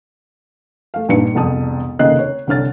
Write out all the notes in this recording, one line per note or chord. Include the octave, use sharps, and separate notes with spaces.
A3 F5
A#1 G2 D#4 B4 C#7
E1 C2 F2 A5 D#6
F1 D#2 C#3 D#5 F#6 C7
C#5
C2 D3 C#5 F6 A6